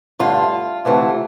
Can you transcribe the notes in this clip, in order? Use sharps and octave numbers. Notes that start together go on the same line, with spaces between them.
G2 D3 A3 F4
D2 C3 E3 A3